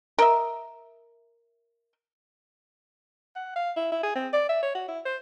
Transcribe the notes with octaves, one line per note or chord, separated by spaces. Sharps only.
A#4 D#5 E5
F#5
F5
E4
E4
G#4
C4
D5
E5
C#5
F#4
E4
C5